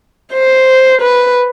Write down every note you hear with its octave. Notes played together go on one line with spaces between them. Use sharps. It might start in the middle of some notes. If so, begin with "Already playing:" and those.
C5
B4